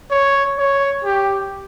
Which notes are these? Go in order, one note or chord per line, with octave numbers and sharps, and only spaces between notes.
C#5
C#5
G4